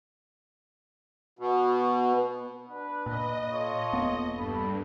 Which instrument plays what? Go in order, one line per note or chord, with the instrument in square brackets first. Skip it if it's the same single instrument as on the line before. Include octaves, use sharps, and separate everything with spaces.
[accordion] B2
[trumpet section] D4 B4
[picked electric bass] A#2 [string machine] D#5
[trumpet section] F4 A4 C#5
[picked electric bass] E1 A#3 B3
[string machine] G2 [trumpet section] A4 B5